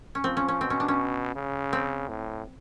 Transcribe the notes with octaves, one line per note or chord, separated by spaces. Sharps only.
C#4
F3 C4
C#4
C#4
B2 C4
C#4
D4
C#4
C#3
C4
A2